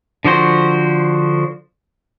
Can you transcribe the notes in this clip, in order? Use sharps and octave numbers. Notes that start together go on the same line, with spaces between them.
D3 F3 F#4 C5